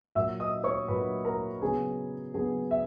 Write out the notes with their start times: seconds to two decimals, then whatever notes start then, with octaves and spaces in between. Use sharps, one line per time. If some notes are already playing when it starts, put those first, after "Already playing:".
0.15 A#2 F#3 A#3 E5 E6
0.40 D#5 D#6
0.64 C#5 C#6
0.88 A#2 F#3 A#3 B4 B5
1.25 A#4 A#5
1.62 C#3 F#3 B3 G#4 G#5
2.34 C#3 F#3 B3 G#4 G#5
2.71 E5